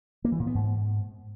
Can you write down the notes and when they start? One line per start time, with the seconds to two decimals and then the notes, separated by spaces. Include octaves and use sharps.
0.25 A#3
0.32 E3
0.40 A#2
0.47 B3
0.55 G#2